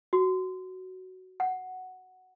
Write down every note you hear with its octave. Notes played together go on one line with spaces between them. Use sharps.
F#4
F#5